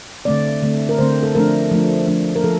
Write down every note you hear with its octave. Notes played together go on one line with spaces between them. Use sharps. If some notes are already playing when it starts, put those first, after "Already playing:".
D3 A3 C4 D5
D3 A3 C4
A#4
D3 A3 C4 C5
A4
F3 A3 D4 A#4
F3 A3 D4
F3 A3 D4
A#4
F3 A4